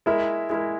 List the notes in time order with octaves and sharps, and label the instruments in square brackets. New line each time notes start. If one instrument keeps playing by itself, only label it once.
[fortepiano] G#3 E4 A#4 [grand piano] E5
[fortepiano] G#3 E4 A#4